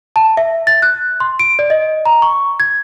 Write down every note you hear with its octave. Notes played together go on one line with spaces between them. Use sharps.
A5
E5
A6
F#6
C6
D7
D5
D#5
A#5
C#6
G#6